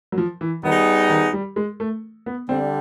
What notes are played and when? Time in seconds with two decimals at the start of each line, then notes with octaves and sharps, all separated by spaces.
0.12 F#3
0.18 F3
0.41 E3
0.63 D#3 G3 B3 D#4 G#4
1.10 D#3
1.33 G3
1.56 G#3
1.80 A3
2.26 B3
2.49 D3 G3 C4